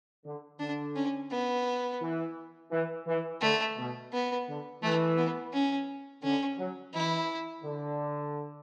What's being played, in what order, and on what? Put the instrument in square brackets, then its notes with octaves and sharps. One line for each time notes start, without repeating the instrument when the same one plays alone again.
[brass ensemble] D3
[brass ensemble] D3 [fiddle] D4
[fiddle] C#4
B3
[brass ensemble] E3
E3
E3
[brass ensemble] D3 [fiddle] A3
[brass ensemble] B2
[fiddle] B3
[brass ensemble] D3
[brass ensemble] E3 [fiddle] A3
[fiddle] B3
C#4
[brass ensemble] D3 [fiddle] C#4
[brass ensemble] F#3
[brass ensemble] E3 [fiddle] E4
[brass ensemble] D3